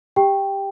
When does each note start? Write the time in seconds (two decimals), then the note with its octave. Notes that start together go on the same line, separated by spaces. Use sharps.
0.16 G4 G5